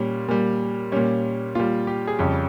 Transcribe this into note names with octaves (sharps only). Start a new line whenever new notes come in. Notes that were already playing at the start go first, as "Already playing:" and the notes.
Already playing: A#2 G3 C#4
A#2 G3
A#2 G3 C#4
A#2 G3 F4
G4
G#4
F2 C#3 G3 G4